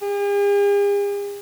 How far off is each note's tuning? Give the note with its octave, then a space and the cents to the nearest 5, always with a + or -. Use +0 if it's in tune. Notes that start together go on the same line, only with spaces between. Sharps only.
G#4 -45